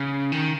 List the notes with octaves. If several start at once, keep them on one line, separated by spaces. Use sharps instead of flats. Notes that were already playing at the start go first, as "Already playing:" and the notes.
Already playing: C#3
D#3